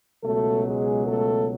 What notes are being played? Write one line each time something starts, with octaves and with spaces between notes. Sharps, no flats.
C#2 B2 F#3 A3 A4
G#3 G#4
A3 A4